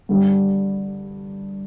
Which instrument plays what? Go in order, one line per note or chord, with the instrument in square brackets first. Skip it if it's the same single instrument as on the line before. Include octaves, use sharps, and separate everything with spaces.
[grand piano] G2 D3 G3